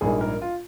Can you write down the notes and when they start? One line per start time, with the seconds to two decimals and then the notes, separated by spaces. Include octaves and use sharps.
0.01 A#1 G#2 G3 A#3 G#4
0.21 A#4
0.42 F4